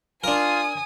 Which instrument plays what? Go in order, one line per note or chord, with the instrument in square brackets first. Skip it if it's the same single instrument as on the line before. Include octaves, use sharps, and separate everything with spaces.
[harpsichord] D4 A#4 [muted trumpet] F4 [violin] G#5 D#6